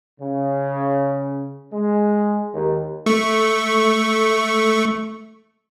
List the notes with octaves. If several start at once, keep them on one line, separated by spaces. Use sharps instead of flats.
C#3
G#3
D#2
A3 C#6